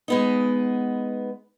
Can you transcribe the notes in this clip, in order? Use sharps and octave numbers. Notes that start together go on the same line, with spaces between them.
G#3 B3 D#4